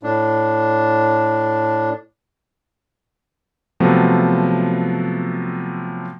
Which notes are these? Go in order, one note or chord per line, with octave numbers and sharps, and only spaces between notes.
A2 D4
C3 F3 F#3 A3 B3